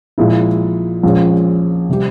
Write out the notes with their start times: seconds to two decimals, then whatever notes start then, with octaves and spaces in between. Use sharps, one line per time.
0.18 A#1 A#2 G#3 E4
1.03 A#1 A#2 G#3 C#4
1.90 C3 G3 C4 G4